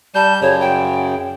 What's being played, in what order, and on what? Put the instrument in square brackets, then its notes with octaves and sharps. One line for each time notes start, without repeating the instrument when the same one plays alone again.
[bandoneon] G3 G6 [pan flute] A5
[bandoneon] F#2 C#3 [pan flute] C#5
[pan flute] G5